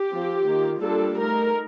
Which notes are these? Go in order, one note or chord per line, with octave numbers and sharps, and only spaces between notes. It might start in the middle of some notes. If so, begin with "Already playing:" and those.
Already playing: G4
F3 C4 F4
D#3 A#3 F4
G3 A#3 D4 F4 A4
A3 D#4 A#4